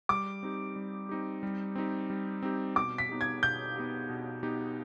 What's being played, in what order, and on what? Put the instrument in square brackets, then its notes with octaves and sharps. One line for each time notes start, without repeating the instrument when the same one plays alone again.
[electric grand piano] G3 [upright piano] D6
[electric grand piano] C4 D#4 G4
G3
C4 D#4 G4
G3
C4 D#4 G4
G3
C4 D#4 G4
[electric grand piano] B2 [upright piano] D6
[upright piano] B6
[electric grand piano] B3 D#4 G4
[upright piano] G#6
[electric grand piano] B2 [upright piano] G6
[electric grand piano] B3 D#4 G4
B2
B3 D#4 G4